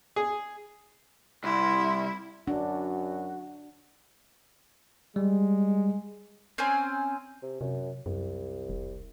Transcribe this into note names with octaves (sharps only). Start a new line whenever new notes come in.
G#4
C2 E4 C6
F#2 D4 F#4
G3 G#3
C4 C#4 C5 G#5
C3
F#2 C3
C2 F#2
F1